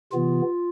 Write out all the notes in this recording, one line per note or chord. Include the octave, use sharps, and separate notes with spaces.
C3 E3 B3 F4